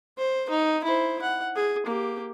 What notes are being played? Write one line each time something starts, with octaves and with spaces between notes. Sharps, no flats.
C5
D#4
E4 C5
F#5
G#4
A#3 G4